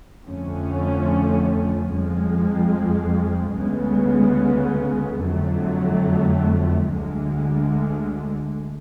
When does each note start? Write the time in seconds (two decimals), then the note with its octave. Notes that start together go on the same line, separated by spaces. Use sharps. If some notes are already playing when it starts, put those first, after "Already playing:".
0.24 F2 D3 F3 A3 C#4
1.91 F2 F3 G#3
3.56 D2 C#3 G#3 B3
5.23 F2 D3 F#3 A3
6.89 D2 D3 G#3